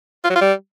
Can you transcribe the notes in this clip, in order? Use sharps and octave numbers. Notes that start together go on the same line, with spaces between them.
F4
F#3
F4
G3